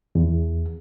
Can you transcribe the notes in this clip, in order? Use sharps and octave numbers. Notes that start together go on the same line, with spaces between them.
E2